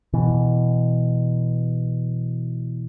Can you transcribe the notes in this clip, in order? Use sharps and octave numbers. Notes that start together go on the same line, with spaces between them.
B2 E3